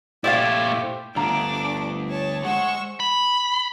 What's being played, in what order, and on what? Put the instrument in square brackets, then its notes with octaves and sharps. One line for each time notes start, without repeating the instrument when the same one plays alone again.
[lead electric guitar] A#2 E4 [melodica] A3 G4 C5 [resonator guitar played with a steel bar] D5 D#5 F5
[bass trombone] G1 [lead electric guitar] D2 [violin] D4 D6 [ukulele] G#4 F5 A#5
[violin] C#5 A5
[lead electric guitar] G#3 [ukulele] C5 C#5 F#5 [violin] C#6 E6
[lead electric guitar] B5